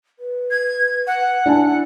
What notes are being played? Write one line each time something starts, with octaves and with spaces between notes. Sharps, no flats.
B4
G#6
F#5
D4 E4 G#5 A5